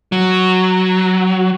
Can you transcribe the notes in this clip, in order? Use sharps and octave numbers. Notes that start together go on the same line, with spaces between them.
F#3